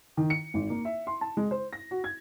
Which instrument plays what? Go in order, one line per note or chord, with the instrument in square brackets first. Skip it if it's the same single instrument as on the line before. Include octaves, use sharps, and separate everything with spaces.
[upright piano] D#3
C#7
G#1
A#3
E5
C6
A5
G#3
C5
A#6
F#4
G#6